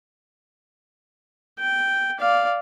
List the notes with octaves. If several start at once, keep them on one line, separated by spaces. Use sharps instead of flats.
G5
D5 F5